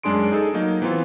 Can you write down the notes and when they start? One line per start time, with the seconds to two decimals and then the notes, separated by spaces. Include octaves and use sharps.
0.03 F#2 G#3 D4 G#4 C6 D7
0.32 D#4 G#4 A4
0.54 F#3 A#3 D#4
0.82 E3 B3 C4 F4